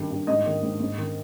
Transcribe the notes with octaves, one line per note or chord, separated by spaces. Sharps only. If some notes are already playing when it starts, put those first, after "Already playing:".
Already playing: G2 D#3
G2
G#2 D#5
D#3
G#2
G#2
D#3